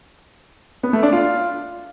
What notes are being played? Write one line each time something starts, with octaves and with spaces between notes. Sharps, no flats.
B3
A3
D4
F4